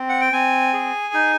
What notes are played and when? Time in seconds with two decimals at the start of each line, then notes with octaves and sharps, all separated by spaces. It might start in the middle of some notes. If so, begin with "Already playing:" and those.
Already playing: C4
0.09 F#5
0.21 G5
0.33 C4 G#5
0.73 G#4
1.14 D#4